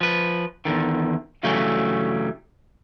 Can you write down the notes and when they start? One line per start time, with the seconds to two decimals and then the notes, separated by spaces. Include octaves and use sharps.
0.01 F3 B4
0.65 E2 B2 D3 D#3
1.43 G2 C#3 E3 F#3 G3 A3